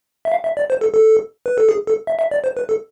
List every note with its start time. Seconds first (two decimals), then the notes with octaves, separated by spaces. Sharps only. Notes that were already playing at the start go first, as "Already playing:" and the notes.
0.25 E5
0.32 F5
0.44 E5
0.57 D5
0.70 C5
0.81 A4
0.94 A4
1.46 B4
1.58 A4
1.69 G#4
1.87 A4
2.07 E5
2.19 E5
2.31 D5
2.44 C5
2.57 B4
2.69 A4